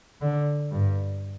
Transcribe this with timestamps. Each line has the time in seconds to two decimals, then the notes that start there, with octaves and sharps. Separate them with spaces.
0.21 D3
0.72 G2